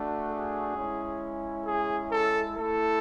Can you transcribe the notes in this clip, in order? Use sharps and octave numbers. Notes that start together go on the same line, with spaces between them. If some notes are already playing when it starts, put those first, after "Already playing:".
Already playing: A3 D4 F#4
G#4
G#3 C#4 E4
G#4
A4
A3 E4 A4